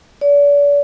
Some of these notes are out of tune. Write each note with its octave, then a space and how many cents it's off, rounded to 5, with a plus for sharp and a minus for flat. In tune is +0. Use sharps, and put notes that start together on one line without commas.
D5 -40